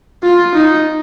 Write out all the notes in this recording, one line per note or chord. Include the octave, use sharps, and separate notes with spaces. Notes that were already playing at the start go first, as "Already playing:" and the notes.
F4
D#4